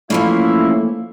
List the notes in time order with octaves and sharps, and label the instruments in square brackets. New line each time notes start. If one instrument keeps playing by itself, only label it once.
[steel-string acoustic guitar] E3 F3 C#4 [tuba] A3 [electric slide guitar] A#3 F5 [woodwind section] E4